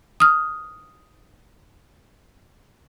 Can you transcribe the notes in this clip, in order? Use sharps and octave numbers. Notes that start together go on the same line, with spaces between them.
D#6 F6